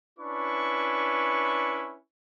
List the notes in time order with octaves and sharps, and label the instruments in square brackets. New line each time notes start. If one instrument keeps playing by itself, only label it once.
[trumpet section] C#4 D4 E4 B4 C#6